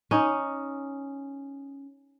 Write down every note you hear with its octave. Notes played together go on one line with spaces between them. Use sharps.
C#4 D#4